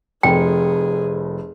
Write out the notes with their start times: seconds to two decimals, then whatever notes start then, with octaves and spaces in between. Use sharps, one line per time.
0.23 F1 F2 G#4 G5